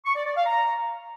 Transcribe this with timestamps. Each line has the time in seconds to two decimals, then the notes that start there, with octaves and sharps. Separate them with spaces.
0.05 C#6
0.16 D5
0.26 D5
0.36 F5
0.46 A#5